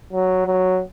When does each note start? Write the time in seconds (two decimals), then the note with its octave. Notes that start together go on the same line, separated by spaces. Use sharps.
0.13 F#3
0.46 F#3